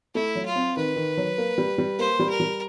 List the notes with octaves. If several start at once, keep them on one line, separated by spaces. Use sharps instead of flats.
A3 E4
F#3
F4
C4
D#3 B4
D#3
F#3
A#3
G3
G3
A#3 C5
G3
A#4
G3